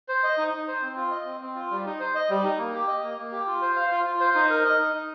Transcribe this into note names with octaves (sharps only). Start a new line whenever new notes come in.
C5
D#5
D#4
D#4
C5
C4
F4
D#5
C4
C4
F4
G3
D#4
C5
D#5
G3
D#4
A#3
G4
D#5
A#3
A#3
G4
F4
C5
F5
F4
F4
C5
D#4
A#4
D#5
D#4
D#4